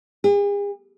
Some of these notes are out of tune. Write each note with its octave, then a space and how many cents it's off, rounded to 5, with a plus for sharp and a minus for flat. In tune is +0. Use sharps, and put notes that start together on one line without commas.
G#4 -45